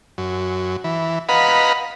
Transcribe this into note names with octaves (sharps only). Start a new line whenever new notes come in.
F#2
E3
B4 D#5 F5 F#5 A#5 B5